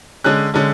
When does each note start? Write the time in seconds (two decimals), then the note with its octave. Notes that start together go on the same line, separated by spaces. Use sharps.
0.24 D3 G#3 C#4 F#6
0.54 D3 G#3 C#4